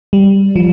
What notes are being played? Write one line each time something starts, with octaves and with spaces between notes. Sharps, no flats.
G3
F3